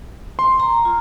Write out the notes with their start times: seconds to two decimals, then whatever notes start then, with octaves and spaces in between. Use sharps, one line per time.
0.39 C6
0.60 A#5
0.85 F4